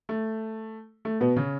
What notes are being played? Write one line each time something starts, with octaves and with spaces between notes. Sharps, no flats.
A3
A3
B2 B3
C#3 C#4